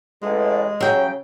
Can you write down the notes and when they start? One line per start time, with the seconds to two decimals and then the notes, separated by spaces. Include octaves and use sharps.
0.23 A1 G#3
0.81 C#3 F#3 G5